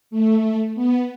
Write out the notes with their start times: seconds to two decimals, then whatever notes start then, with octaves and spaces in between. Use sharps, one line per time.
0.11 A3
0.75 B3